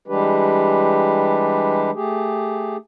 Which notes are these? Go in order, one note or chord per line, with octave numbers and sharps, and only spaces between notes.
E3 G3 G#3 D4 G4 B4
A3 G4 G#4